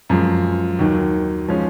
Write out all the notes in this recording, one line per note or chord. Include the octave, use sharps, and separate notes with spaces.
F#2 F3 G#3
D#2 D#3 F#3
F3 G#3 C#4